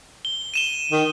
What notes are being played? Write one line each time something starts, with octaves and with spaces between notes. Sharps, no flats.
G7
D#7 E7 G7
D#3